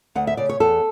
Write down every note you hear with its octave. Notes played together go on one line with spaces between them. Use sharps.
D2 F#5
E5
C#3 D5
C#5
E2 A4